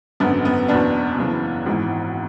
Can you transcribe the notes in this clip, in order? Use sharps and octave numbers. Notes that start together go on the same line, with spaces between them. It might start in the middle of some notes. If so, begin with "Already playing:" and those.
G#1 F#2 D3 B3
B3
F#1 E2 B2 B3 D4
F#1 F#2 C#3 E3
G#1 G#2 E3